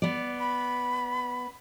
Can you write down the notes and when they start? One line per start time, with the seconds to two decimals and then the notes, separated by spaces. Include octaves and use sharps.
0.02 B3 D5
0.39 B5